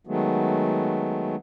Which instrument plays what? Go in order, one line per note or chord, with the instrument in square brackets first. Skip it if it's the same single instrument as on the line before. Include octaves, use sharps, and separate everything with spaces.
[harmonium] D#3 F#3 G#3 A3 B3